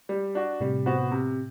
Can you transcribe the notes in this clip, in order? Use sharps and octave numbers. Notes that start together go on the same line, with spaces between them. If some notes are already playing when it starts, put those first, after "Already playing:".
G3
D4 F#4
A2 C3 G3
B3 F#4 C5
C3